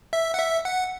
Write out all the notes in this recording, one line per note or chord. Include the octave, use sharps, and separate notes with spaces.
E5
F#5
E5
F#5